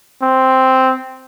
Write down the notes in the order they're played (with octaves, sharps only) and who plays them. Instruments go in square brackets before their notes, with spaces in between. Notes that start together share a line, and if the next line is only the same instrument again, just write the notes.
[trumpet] C4